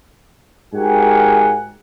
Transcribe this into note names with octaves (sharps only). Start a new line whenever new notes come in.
G#2 F#4 G4 A#4 F#5 G#5